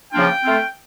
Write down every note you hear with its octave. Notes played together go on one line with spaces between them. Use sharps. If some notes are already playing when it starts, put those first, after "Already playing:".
C#3 F3 A#3 D4 F4 G5
A3 C4 F4